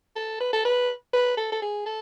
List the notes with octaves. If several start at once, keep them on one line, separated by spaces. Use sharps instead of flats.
A4
B4
A4
B4
B4
A4
A4
G#4
A4